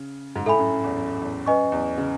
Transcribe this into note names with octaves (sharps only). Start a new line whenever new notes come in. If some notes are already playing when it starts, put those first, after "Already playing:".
Already playing: C#3
G#2
A2 A4 E5 G#5 B5
F#2
F#2
E2
F#2
E2
F#2 B4 D#5 G#5 C#6
E2
C#3